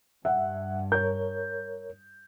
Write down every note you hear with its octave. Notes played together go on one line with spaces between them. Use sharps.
G2 E5 F#5
A#4 C#5 G6